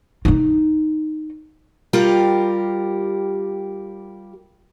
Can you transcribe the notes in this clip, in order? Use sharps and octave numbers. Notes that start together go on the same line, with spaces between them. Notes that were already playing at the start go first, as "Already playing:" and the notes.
D#4 F4
G3 F4 G4 A#4